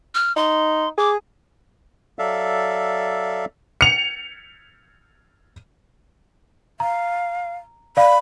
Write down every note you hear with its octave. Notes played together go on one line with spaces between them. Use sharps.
F6
D#4 C6
G#4 D6
F#3 A4 D5 E5 F5
C#7 F7
F5 A#5
D5 F5 B5